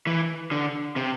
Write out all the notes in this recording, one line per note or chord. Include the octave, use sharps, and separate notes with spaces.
E3
D3
C3